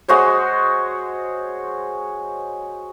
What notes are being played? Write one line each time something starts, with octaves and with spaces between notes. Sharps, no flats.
G#3 F#4 C5 C#5